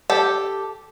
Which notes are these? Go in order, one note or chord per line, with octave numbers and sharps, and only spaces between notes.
G4 A4